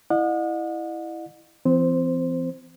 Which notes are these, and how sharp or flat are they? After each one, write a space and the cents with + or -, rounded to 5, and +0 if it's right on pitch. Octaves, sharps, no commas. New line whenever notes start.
E4 +0 D#5 -40 F#5 -40
E3 +45 C4 -25 C5 +0